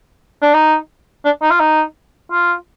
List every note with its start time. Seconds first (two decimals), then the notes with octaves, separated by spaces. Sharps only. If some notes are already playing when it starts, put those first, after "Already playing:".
0.42 D4
0.54 D#4
1.25 D4
1.42 D#4
1.50 F4
1.60 D#4
2.31 F4